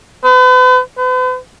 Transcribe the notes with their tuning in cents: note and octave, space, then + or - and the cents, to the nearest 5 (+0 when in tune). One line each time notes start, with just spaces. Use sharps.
B4 +40
B4 +45